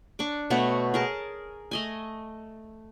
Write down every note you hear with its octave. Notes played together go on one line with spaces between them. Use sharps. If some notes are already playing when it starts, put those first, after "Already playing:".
D4 C#6 D6
B2 A3 B3 C#5
G#4 A#4 A5
A3 D#5 G#5